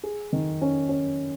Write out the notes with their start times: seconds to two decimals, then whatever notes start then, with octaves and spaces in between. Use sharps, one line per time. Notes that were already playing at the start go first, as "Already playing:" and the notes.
0.03 G#4
0.33 D#3
0.61 C#4
0.89 C#4